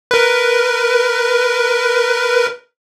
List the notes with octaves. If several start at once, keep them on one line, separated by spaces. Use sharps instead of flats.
A#4 B4